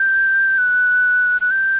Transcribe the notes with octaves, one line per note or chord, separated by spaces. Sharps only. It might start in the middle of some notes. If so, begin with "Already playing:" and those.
Already playing: G6
F#6
F#6
G6